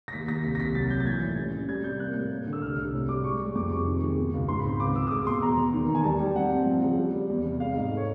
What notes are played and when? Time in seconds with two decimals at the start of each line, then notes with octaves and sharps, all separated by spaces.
0.08 A#6
0.13 D#2 B6
0.28 D#2 A#6
0.44 C2 B6
0.55 A#6
0.59 C2 B6
0.75 F#3 A6
0.90 A#2 G6
1.00 A6
1.06 E3 G#6
1.22 A2
1.38 C#4
1.53 C#4
1.69 G3 G#6
1.84 C3 G6
2.00 A#3 F#6
2.15 A2
2.31 A#3
2.47 D3
2.53 E6
2.62 C2 F6
2.77 C2
2.93 A2
3.09 G3 D6
3.24 G#3 C#6
3.40 G#3
3.55 F2 D6
3.71 C3 C#6
3.87 D#3
4.02 G#3
4.18 B2
4.34 C#2
4.48 G#2 C6
4.59 B5
4.64 C4
4.80 C#2 D6
4.95 C#2 E6
5.07 D#6
5.11 G#3 D6
5.27 B2 C6
5.42 E2 A#5
5.58 E2
5.74 D#3
5.89 E2
5.95 G#5
6.04 G3 A5
6.20 G3 G5
6.36 C4 F#5
6.51 C4
6.66 F3
6.83 C#3
6.98 G3
7.14 G3
7.29 E2
7.45 C3
7.60 G#3 F5
7.76 G#2 D#5
7.91 A3
7.97 C#5